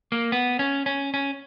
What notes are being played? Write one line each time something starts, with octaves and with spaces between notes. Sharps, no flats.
A#3
B3
C#4
C#4
C#4